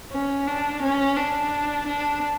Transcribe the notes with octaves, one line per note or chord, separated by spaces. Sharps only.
C#4
D4
C#4
D4
D4